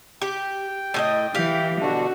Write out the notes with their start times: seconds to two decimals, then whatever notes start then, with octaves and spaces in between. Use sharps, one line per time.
0.22 G4 G5
0.94 A2 F#4 D#5
1.35 E3 G4 F5
1.81 B2 D3 D4 F#4